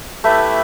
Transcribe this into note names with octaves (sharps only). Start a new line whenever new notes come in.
A3 E4 G4 B4 E5